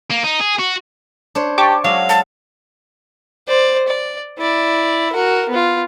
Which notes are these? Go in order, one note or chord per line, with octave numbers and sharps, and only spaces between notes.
A#3
D#4
G#4
F#4
D4 C5 C#5
G4 A5 C#6 D6
F#3 G#3 E5 F5
A5
C5 D5
D5
E4 D5
F#4 A#4
B3 F4